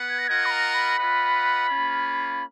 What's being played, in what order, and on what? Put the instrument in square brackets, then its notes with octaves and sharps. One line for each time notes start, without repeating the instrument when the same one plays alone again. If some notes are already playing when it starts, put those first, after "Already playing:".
Already playing: [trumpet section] B3 B4 F#5
[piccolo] G#6
A#6
[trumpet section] F4 A#4 D#5 F#5 [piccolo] G#6
[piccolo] B5
A#5
B5
[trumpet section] F4 B4 D#5 F#5
A#3 C#4 F4